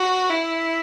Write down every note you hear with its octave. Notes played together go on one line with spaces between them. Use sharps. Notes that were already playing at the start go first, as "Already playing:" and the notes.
Already playing: F#4
E4